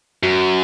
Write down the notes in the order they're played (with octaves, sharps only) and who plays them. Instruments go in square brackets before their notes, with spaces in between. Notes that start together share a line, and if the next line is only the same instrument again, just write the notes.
[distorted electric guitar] F#2 [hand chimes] F#4